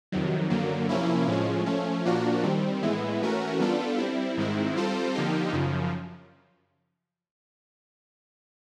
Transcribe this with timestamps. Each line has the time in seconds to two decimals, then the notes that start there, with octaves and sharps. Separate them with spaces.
0.12 F2 C3 D#3 F#3
0.50 F#2 D3 F#3 A#3
0.89 C3 F3 A#3 C#4 E4
1.27 A2 F3 G#3 C#4
1.66 F3 A3 C#4
2.05 A#2 F3 A#3 D4 F#4
2.44 D#3 G3 C4
2.83 A2 E3 G#3 B3 E4
3.22 E3 A3 C#4 F#4 A#4
3.60 G3 B3 D4 F4 A4
3.98 G3 C4 E4
4.37 G#2 D#3 G#3 C4 E4
4.76 G3 C4 F4 A4 C5
5.15 D3 F3 A#3 D#4 G4
5.53 F#2 C#3 F3